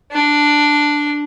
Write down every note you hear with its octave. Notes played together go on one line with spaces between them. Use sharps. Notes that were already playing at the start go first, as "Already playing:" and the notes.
D4